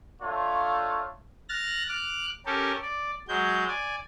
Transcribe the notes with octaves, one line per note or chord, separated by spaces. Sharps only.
A3 D4 F4 C#5 F5
F6 F#6 A6 A#6
D6 F6 F#6
C#4 G4 A4 A#4
D5
F#3 G#3 G6
D5 G#5